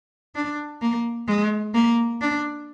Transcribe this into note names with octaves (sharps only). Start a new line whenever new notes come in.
D4
A#3
G#3
A#3
D4